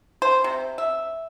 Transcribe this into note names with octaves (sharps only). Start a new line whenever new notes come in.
C5
C3
E5